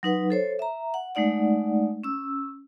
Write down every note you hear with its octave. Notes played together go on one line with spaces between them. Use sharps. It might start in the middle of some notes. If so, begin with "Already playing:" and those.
F#3 D#4 B4 F#5
A4 C5 C#5
E5 A#5
F#5
G#3 A3 D#4 D5 F#5
C#4 E6